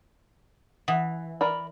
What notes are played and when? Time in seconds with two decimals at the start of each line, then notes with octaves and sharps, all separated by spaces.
0.88 E3 F#5 D#6
1.41 A#4 D5 B5